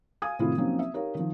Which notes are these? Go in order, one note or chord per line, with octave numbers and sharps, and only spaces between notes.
F5 G#5 D#6 G#6
A2 C3 D#3 C4 E4 F4
F3 F#3 A#3 C4 C#4 D#4
E5
D#4 G4 A#4 C#5 F5
D#3 F3